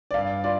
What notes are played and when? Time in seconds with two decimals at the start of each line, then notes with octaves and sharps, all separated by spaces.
0.11 D5
0.14 G2 F5
0.44 F4 D5